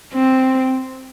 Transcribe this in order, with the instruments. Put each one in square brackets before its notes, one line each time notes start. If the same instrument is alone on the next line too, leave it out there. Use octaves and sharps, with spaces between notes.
[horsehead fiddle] C4